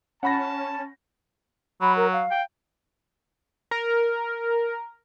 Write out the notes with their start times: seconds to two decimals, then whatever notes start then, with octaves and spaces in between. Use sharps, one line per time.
0.23 C#4 F#5 A5 B5 A#6
1.82 F#3 B5
1.96 A#4
2.13 F5
2.31 G5
3.71 A#4